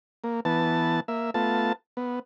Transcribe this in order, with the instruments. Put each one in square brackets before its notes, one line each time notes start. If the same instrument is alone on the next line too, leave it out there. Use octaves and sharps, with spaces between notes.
[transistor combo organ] A#3
E3 B3 A5
A#3 E5
A3 B3 F4 A5
B3